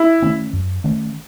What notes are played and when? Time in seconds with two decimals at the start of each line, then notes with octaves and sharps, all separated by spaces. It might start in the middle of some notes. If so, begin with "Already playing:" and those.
Already playing: E4
0.23 D#3 A3 C#4
0.53 F#2
0.84 D#3 A3 C#4